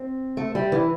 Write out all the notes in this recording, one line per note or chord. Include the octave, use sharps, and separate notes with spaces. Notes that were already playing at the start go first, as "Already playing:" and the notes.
Already playing: C4
A3
G3
E3